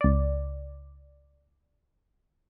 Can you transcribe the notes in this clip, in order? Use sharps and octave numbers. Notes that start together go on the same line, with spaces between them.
C#2 D5